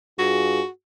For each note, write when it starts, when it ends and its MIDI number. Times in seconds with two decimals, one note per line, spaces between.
0.19 0.61 43
0.19 0.61 65
0.19 0.68 66
0.19 0.61 68